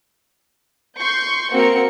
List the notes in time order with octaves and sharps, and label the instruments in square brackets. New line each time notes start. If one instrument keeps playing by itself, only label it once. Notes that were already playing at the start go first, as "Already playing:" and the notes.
[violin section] C6 C#6 G6
[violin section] A#3 F#4 C#7 [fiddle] C4 A#4